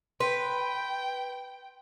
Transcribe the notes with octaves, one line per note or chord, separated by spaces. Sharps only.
B4 G5 C6